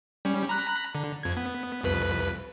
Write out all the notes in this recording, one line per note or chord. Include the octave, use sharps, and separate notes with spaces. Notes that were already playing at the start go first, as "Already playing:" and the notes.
G3 C#4
A#5 B5 F#6
D3
F2 G#6
B3
C2 F2 B4